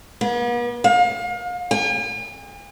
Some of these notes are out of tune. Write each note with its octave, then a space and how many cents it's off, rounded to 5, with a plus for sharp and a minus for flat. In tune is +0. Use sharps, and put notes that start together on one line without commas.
B3 -45
F5 +35
G#5 -45